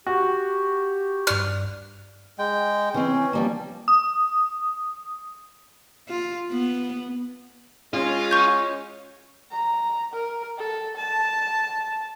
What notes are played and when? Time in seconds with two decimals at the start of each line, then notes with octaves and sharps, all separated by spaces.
0.06 F#4 G4
1.27 G2 D5 F6
2.39 G#3 G5
2.94 E3 C4 C#4
3.33 F3 G3 A#3
3.88 D#6
6.08 F4
6.51 B3
7.94 G#3 C#4 F4
8.31 C#6 G6
9.51 A#5
10.14 A#4
10.58 A4
10.97 A5